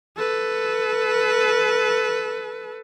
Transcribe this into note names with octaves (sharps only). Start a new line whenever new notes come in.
A4 B4